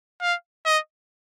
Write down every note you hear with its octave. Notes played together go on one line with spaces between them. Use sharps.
F5
D#5